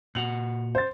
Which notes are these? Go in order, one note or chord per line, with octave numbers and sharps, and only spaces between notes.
A#2 F#4 F#5 F7 F#7
C5 A6